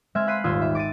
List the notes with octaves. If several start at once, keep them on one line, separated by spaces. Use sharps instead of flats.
G#3 C4 E5 F6 G#6
F5 B5 F#6 B6 C7 D#7
D#1 G#1 F4 D#6 E6 G#6
E5
D6 A6 D7 D#7